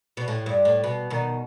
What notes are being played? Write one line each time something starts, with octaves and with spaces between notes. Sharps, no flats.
B2
A2
G2
A2
B2
B2 D#3